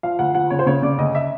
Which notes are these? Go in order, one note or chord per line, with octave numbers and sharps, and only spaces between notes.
F3 F5
D2 F#5
F3 F#5
C#3 C#5
C5
C#3 C#5
C#3 D5
D2 D#5
E5